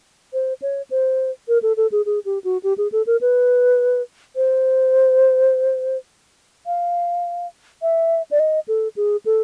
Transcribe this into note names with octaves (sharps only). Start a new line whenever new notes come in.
C5
C#5
C5
A#4
A4
A4
G#4
G#4
G4
F#4
G4
G#4
A4
A#4
B4
C5
F5
E5
D5
D#5
A4
G#4
A4